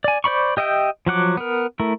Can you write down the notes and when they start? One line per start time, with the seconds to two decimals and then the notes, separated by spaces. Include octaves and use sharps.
0.04 D5 G#5
0.24 C5 D5 B5 C#6
0.57 G4 D#5 E5 G5
1.07 F3 F#3 F#5 D6
1.37 B3 A#4
1.80 A3 E4 A#4